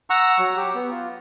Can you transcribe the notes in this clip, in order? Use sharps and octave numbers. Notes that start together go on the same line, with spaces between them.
F#5 A#5 C#6 E6
F#3
G4
B3
F4